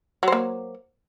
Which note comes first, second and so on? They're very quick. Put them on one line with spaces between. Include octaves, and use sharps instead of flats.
F#3 C5 A#3